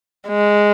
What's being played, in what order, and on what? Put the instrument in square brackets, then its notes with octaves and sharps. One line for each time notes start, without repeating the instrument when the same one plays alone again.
[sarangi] G#3